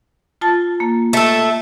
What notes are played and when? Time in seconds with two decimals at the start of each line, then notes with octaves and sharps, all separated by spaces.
0.41 F4 A5 A6
0.80 A#3
1.13 A3 A4